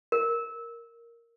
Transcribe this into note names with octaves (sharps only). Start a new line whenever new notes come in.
A#4